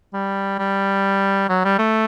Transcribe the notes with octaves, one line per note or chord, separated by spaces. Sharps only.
G3
G3
F#3
G3
A3